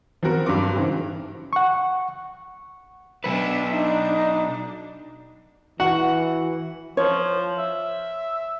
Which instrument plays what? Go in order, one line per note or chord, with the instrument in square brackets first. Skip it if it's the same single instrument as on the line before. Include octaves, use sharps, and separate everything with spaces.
[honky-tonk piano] F3 B3 C4 F#4 A#4
G2 F#3 D4 C6 D6
G#2 C#3 E3 C4
[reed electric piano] F#5 C#6
[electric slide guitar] B2 F#3 B4 [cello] D4 E5
[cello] D4 [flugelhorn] D#4
[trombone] E3 [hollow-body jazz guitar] F#4 [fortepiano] F#5
[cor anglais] F3 [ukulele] C#5
[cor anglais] E5